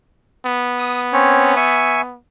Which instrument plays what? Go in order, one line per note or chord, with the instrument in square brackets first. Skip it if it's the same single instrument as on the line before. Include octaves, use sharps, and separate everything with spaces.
[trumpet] B3
[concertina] D#6
C4 C#4 C#5
E5 G#5 C#6